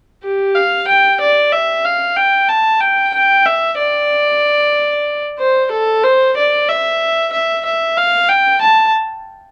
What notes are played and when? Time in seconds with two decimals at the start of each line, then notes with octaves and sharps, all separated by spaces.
0.24 G4
0.55 F5
0.88 G5
1.21 D5
1.52 E5
1.85 F5
2.17 G5
2.49 A5
2.81 G5
3.14 G5
3.46 E5
3.79 D5
5.39 C5
5.72 A4
6.03 C5
6.37 D5
6.69 E5
7.33 E5
7.65 E5
7.97 F5
8.29 G5
8.61 A5